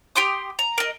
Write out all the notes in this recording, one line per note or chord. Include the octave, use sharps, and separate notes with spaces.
G4 G5 C6 D#6
A#5
A#4 D#5